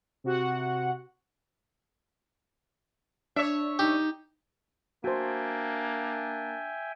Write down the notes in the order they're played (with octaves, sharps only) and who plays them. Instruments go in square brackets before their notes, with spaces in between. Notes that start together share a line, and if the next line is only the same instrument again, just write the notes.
[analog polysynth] C3 F#4 F#5
[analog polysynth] D4 [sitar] C#5 E5
[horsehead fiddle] D#4 [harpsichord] G4
[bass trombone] A#3 [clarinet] D4 [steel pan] F#4 C5 [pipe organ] E5 G5 G#5